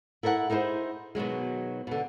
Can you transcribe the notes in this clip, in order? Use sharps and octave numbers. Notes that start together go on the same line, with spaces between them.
E4 A4 A#4 D#5 F#5
D#4 E4 G#4 A#4 C5
B2 D#3 F#3 G#3
B2 D3